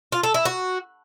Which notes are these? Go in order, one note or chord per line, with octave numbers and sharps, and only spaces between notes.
F4
A4
E4
F#4